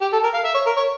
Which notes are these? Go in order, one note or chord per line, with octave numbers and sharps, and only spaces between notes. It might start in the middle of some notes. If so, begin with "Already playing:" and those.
G4
A4
A#4
F5
E5
C#5
A#4
C#5